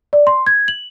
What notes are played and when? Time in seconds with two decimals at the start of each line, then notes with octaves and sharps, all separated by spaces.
0.13 D5
0.27 C6
0.47 G#6
0.68 F#7